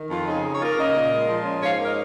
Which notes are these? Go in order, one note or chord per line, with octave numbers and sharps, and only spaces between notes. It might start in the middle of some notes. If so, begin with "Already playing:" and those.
Already playing: D#3
F2 F4
C#3 D#4 G#4
D#4
C#5
A#3 F4 A#4
C#3 A#4 D#5
A#2
G#3
F3
C#4
G#2 C#5 F5
A#3
A#4 D#5